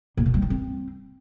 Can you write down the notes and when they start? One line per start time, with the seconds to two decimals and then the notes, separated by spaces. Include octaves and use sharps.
0.17 A#2
0.26 B2
0.34 G3
0.42 D#3
0.50 C4